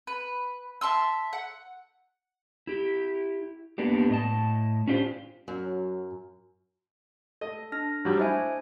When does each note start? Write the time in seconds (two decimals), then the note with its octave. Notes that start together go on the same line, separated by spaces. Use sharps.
0.07 B4
0.81 E5 A5 C6 E6
1.33 F#5
2.67 E4 G4
3.78 A#3 B3 D4 G4
4.10 A2 D#5 A5
4.87 C#4 D4 F4 G4 C5
5.48 F#2 F#3
7.41 A4 D#5
7.72 D4 F6 A#6
8.05 F#3 G3
8.17 D4 E4 C5 D#5 G#5